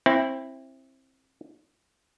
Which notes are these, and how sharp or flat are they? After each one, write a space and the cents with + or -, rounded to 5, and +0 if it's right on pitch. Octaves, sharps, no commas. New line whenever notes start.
C4 +25 E4 +0